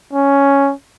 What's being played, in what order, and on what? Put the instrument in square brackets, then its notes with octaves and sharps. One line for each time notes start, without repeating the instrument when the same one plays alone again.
[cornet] C#4